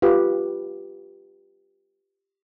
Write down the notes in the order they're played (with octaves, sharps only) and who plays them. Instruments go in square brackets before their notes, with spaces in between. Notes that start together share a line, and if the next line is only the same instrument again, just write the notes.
[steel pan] F4 G4 B4